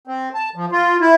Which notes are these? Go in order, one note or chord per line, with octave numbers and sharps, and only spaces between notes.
C4
A5
F3
F4
E4